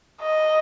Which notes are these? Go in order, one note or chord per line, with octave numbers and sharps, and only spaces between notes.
D#5